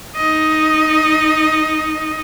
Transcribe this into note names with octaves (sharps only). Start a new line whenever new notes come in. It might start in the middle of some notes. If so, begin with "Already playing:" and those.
D#4 D#5